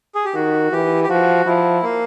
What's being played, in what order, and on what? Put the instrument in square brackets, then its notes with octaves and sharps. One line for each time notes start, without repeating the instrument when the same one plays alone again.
[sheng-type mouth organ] G#4
G4
[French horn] D#3 [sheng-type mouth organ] F#4
[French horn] E3 [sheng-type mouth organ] G4
[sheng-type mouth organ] G4
[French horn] F3 [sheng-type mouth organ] F#4
[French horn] F3 [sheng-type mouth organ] E4
[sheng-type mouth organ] A#3